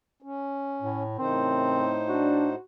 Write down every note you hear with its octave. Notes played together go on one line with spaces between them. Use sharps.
C#4
A2
A2 C#3 E3 C4 D#4 A#4 C5
D4 F#4